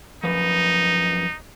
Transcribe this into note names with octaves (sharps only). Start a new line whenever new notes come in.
F#2 F3 D#4 B4